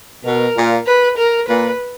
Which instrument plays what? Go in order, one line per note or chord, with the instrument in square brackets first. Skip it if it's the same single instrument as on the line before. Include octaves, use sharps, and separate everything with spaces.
[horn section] B2 [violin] A#4
[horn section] A#2
[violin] B4
A#4
[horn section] A#2 [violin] B4